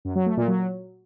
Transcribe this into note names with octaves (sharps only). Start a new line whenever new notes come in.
F#2
F#3
A3
A#2
F#3